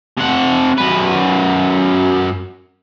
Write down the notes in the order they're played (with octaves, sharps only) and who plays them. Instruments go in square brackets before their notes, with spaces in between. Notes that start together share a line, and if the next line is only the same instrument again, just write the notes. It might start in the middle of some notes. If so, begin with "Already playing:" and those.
[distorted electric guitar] C3 F#5
F#2 B4